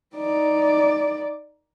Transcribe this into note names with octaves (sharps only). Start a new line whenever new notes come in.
D#4 D5